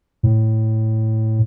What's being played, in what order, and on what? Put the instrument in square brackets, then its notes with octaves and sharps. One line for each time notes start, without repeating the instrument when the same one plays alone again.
[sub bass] A2